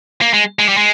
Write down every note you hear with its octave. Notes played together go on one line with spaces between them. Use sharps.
A#3
G#3
G#3
G3
G#3